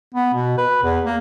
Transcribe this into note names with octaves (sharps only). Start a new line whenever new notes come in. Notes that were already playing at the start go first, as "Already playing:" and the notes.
B3
B2
B4
E2
A#3